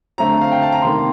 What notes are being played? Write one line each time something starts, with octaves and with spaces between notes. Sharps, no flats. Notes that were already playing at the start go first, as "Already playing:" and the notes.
D3 A3 C4 A#5
F5
G5
A5
A#5
C3 D#3 A#3 C6